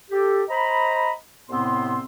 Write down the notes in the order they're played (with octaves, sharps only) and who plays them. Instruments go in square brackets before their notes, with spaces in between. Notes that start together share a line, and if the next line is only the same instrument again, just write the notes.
[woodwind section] G4 A4
C5 D#5 A#5 B5
C2 A2 C3 B3 C4 C6